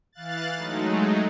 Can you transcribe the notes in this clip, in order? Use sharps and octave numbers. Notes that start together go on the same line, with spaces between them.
E3 F5 F#6 A6
F#3 G#3 A3 D#4